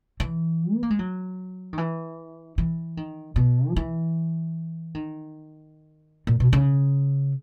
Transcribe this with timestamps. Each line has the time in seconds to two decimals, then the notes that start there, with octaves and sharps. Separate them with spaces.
0.20 E3
0.75 B3
0.83 A#3
0.90 G#3
0.99 F#3
1.73 D#3
1.78 E3
2.58 E3
2.97 D#3
3.36 B2
3.70 F#3
3.76 E3
4.95 D#3
6.27 A#2
6.40 B2
6.53 C#3